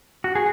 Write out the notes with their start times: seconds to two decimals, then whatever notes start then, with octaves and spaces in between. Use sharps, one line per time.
0.24 F#4
0.35 G#4